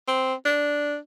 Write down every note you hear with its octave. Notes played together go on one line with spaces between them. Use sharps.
C4
D4